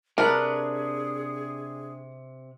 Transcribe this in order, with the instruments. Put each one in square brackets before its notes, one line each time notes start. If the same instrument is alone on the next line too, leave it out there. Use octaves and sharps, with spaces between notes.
[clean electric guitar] C3 [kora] D4 B4 D5 [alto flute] G#4 [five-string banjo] A#4